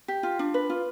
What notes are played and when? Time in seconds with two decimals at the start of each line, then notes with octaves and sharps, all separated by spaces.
0.08 G4
0.23 F4
0.39 D4
0.54 B4
0.70 F4